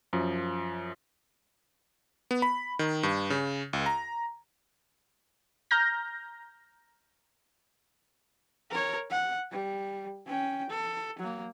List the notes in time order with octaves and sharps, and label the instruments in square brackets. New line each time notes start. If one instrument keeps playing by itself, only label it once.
[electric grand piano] F#2 F3
B3
B5
D#3
G2
C#3
C#2
A#5
[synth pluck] A#5 F6 G6 A#6
[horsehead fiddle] A#4 C#5
F#5
G3
C#4 G5
A4
F#3 A#3